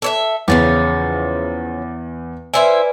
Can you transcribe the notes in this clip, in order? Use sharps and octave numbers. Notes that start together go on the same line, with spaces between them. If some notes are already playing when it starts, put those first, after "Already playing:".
A4 C#5 E5
E2 C#3 F3 C#4 D6 A6
E4 B4 C5 D5 E5 G#5